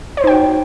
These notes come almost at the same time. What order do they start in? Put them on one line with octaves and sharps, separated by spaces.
C#5 C5 D#4 G5 F#4